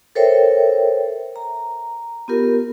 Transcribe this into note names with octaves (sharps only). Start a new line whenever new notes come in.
A4 A#4 C5 C#5 E5 G5
A#5
B3 F4 G4 A#4